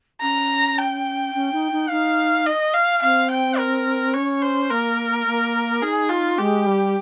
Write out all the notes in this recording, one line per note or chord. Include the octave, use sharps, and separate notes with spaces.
C#4 A#5
G5
C#4
D#4
D#4
D#4 F5
D#5
F5
C4 F5
G5
A#4
C#4 C#5
C5
A#3 A#4
A#3
D#4 G#4
F4
G#3 G4
G3